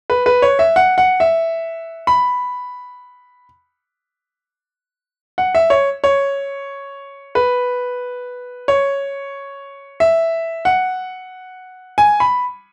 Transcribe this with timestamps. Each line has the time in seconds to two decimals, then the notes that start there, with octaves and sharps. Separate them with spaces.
0.10 B4
0.26 B4
0.42 C#5
0.59 E5
0.76 F#5
0.98 F#5
1.20 E5
2.07 B5
5.38 F#5
5.55 E5
5.70 C#5
6.04 C#5
7.35 B4
8.68 C#5
10.00 E5
10.65 F#5
11.98 G#5
12.20 B5